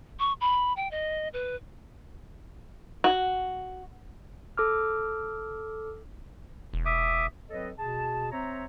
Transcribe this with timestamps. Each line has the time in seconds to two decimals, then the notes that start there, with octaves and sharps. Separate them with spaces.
0.19 C#6
0.41 B5
0.76 G5
0.91 D#5
1.33 B4
3.04 F#4
4.58 A4 D6 F6
6.73 E1
6.86 E5 D6 D#6
7.50 F#3 C4 A4 B4 C#5 D#5
7.78 B2 G#4 A5
8.31 C4 C5 C#5 E5 A#5